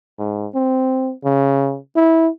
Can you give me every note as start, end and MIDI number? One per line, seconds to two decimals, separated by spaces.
0.19 0.47 44
0.55 1.12 60
1.24 1.78 49
1.96 2.29 64